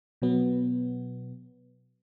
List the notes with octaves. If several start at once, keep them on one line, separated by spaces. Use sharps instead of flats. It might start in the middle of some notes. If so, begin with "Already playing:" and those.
B2 F#3 B3